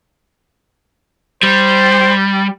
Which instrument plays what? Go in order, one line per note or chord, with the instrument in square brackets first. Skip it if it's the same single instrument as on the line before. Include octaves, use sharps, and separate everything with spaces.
[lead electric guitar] G3 [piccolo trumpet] C5